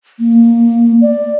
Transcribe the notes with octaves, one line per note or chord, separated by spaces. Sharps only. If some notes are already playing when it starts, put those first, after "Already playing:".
A#3
D5